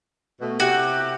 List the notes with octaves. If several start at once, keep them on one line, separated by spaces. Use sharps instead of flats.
B2 A3
C3 E4 F#4 G4